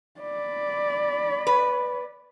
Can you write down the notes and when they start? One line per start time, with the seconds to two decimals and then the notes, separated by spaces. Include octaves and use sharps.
0.21 D5 B5
1.47 B4